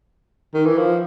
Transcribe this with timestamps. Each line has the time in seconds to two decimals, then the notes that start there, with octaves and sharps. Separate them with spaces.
0.54 D#3
0.66 E3
0.78 F3